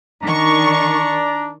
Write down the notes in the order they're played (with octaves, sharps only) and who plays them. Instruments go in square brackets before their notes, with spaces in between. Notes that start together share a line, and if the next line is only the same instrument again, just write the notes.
[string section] D#3 C#6 [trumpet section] D4 D5 A#5